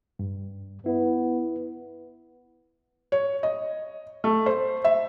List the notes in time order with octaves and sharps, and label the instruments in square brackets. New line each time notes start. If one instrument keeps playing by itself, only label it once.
[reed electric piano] G2
[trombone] B3 [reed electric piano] E4
[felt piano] C#5
D#5
A3
C5
E5